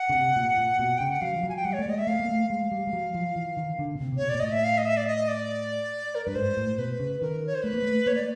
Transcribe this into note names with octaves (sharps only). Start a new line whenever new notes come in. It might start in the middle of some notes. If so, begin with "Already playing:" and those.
Already playing: F#5
C#3
C3
A#2
A#2
B2
C#3 G5
F#5
F#3 F5
F3
F#3
G#5
G5
G3 F#5
C#5
A3
D5
G#3 D#5
E5
A3 F5
A#3
A3
G#3 F5
G3
G3
F#3
F3
E3
D#3
D3
B2
C3
C3
B2 C#5
D5
A#2
A2 D#5
E5
F5
D#5
E5
D5
D#5
D5
A#4
G2 B4
G#2 C5
A2
B2 B4
C#3
D#3 A#4
C#5
C5
A3 B4
A#3
A3
A#3 C#5
D5